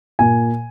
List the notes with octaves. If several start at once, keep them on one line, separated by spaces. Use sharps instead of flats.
A#2 A#3 G#5